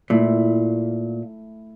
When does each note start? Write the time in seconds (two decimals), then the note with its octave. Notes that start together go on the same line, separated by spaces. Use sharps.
0.10 A#2 A3 E4